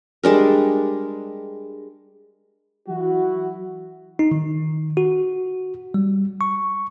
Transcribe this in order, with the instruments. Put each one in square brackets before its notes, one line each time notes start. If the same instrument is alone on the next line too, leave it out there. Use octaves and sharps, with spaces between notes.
[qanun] G3 G#3 D4 A#4
[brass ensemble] E3 F#3 E4 F#4
[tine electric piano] D#4
D#3
F#4
G3
C#6